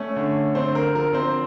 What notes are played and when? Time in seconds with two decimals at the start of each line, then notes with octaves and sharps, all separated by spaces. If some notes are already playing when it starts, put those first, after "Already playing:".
Already playing: A3 C#4 C#5
0.16 D3
0.55 D3 C4 C5
0.75 A#4
0.95 F3 A#4
1.13 C4 C5